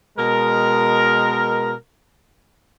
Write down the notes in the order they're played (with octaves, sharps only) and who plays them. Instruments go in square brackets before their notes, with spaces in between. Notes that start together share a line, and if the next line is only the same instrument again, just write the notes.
[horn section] B2 G#3 A#4